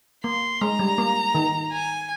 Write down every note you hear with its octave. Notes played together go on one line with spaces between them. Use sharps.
A#3 C6
G#3 A#5
G3
A#3
D#3
G#5